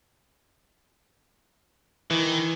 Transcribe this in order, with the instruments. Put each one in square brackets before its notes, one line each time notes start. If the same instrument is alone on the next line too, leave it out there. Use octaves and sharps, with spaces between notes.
[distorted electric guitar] D#3 [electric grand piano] E3